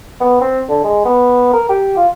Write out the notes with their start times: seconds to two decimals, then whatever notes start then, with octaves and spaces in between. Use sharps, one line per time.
0.21 B3
0.41 C4
0.69 D3
0.84 G#3
1.05 B3
1.53 A#4
1.69 G4
1.97 F4